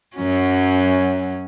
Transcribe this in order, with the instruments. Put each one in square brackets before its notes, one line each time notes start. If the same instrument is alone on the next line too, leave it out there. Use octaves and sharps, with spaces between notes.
[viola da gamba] F#2 F#3 C#4